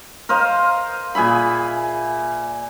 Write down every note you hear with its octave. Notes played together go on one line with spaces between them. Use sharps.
A#4 C5 D#5 F5
A#2 G#4 E5 B5